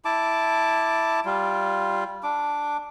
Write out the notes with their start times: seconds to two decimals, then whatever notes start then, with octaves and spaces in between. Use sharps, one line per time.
0.05 E4 A5 D6
1.25 G3 F4
2.23 D4 D6